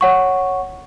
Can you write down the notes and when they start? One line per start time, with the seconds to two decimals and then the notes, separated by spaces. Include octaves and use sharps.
0.01 C#5 F#5 C#6